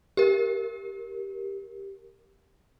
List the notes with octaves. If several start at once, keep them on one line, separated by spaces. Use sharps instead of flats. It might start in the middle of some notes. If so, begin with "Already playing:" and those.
G4 A#4